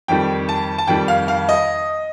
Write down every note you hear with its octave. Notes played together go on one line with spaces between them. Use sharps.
F2 D#3 G3 G5
A5
A5
F2 D#3 G3 G5
F5
F5
D#5